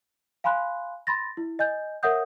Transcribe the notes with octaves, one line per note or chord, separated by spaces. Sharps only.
F5 G#5 B5 C6 F#6
B5 C6 A6 A#6
E4
D#5 G#5 G6
A#4 C#5 E5 F#5 D#6 G6